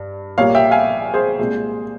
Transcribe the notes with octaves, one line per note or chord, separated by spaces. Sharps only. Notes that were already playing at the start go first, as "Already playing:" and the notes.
Already playing: G2
A#1 A#2 G3 A#3 C#5 F5
E5 G5
F5 G#5
G#4 C5
C2 A#2 G#3